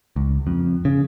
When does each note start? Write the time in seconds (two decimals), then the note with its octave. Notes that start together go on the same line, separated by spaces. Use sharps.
0.16 C#2
0.47 F2
0.85 C#3